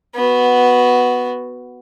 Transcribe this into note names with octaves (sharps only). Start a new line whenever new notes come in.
B3 F#4